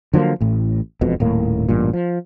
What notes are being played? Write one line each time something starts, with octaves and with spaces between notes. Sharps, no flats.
D3 F3 F#3 A#3
A1 A2
E1 F2 B2
D#1 A2 A#3
A1 G2 A#2
F3